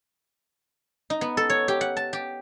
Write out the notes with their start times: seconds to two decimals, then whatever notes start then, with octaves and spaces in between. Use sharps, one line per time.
1.10 D#4
1.21 B3
1.37 A4
1.50 C#5
1.68 G4
1.81 F#5
1.97 A5
2.13 G4